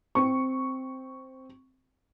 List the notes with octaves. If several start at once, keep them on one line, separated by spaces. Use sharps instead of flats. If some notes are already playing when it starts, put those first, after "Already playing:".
C4 C#6